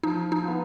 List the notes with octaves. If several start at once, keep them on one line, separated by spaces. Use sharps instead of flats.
F3 D#4
D#4
B3 F4